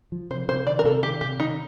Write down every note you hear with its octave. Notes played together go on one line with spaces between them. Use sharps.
F3
C3 C5
C3 C5
D#3 D5
A#4
C3 A4
D#3 G4
C3 G4
D#3 D#4